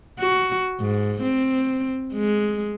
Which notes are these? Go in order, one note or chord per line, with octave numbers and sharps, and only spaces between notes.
F#4
G#2
C4
G#3